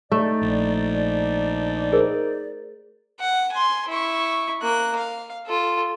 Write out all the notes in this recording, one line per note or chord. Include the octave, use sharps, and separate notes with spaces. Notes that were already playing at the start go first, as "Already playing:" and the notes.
A3 D#4 D5
A#1
G#4 A#4 C5
F#5
G#5 C6
E4 C#6
A#3 F#6
F5
F4 A4